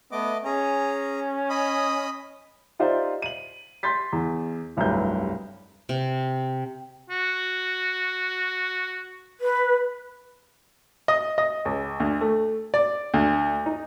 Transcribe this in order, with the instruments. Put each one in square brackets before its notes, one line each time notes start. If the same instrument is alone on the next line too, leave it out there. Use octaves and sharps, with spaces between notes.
[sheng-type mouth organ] A3 D#5 D6 [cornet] B3
[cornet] C#4 [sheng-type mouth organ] G#4 A#5
[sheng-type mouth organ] D#5 B5 D#6
[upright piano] D#4 F4 G4 C5 D5 E5
D#7 F#7
C6 G6 A6 B6
E2
F1 C2 G2 F#3 B4 G6
[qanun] C3
[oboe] F#4
[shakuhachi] B4
[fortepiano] D#5
D#5
C#2
D2
A3
D5
D2
D#4